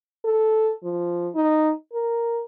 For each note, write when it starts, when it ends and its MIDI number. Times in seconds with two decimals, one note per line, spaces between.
0.25 0.72 69
0.83 1.29 53
1.35 1.72 63
1.93 2.44 70